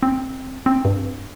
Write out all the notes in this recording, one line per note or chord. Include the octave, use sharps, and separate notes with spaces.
C4
C4
G2